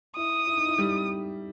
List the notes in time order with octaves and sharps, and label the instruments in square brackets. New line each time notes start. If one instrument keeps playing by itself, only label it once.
[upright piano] E4 [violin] D#6
[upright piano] E4
D#4
E4
G3 G4